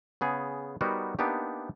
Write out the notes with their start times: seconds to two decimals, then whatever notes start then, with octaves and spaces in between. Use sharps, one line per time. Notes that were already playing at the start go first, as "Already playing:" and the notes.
0.21 C#3 B3 G#4
0.81 G3 B3 D#4 F#4 A#4 C5
1.19 A#3 B3 D4 D#4 G4